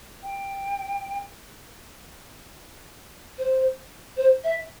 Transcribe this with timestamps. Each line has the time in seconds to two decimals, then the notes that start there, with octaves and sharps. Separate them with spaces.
0.23 G5
3.38 C5
4.17 C5
4.44 E5